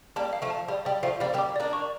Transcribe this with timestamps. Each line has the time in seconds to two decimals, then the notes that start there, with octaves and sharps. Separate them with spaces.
0.16 G3 A#3 A5
0.33 F5
0.42 F3 A3
0.50 A5
0.68 G3 F5
0.85 G3 D5
1.03 F3 A3 F5
1.20 G3 A#3 D5
1.34 G3 A#3
1.38 D6
1.56 A#3 D4 D5
1.73 C#6